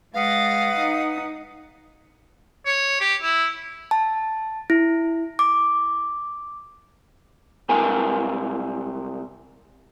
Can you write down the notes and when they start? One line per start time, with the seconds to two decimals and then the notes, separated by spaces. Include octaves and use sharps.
0.14 G#3 B4 F5 F#5 D#6 A6 A#6
0.77 D#4
2.66 C#5
3.01 G4
3.22 E4
3.91 A5
4.70 E4
5.39 D6
7.69 C2 C3 G#3 E4 A#4 G#5